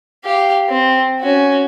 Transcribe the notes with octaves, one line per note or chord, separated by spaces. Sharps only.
G4 F5
C4
C#4 F#4